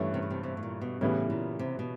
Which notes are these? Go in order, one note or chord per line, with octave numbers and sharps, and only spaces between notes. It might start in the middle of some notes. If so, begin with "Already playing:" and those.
Already playing: G2 E3 A3 C#4
C3
C#3
C3
C3
A2
A#2
B2
A2 C#3 E3 G3 B3
A#2
C3
B2